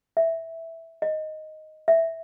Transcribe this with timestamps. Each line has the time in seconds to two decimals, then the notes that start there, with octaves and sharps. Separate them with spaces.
0.17 E5
1.02 D#5
1.88 E5